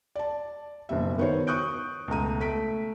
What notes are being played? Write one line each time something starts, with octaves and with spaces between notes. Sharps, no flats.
D5 A5
F#1 G2 B2 G3 E5
D#3 B3 F#4 C5 C#5
C#6 D#6 F#6 G6 D7
C#2 B2 A3 A#5 D#7
A3 B6 D7